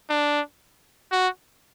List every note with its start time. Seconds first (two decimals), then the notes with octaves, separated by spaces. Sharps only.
0.10 D4
1.12 F#4